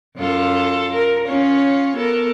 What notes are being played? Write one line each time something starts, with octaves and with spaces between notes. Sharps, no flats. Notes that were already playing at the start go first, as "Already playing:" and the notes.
F#2 F4 A4
A#4
C#4 F4 C#5
B3 A4 A#4